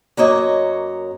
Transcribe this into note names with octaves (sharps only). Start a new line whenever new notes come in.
F#2 A#3 C#5 D#5